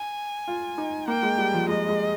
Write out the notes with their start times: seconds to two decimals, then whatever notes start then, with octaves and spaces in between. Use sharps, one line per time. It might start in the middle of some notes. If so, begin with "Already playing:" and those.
Already playing: G#5
0.48 F4
0.78 D#4
1.08 A#3 G5
1.23 G#3
1.38 G3
1.53 F3
1.68 G#3 D#5
1.89 G#3